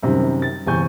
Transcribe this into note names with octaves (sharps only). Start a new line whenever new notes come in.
F#2 C3 D#3 G3 C4
A6
G1 E2 C3 G#5 C#6 G6